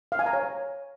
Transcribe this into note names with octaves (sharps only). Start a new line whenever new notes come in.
F5
G#5
A#5
C#5